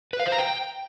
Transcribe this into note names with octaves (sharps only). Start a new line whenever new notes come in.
B4
F5
C5
A#5
G5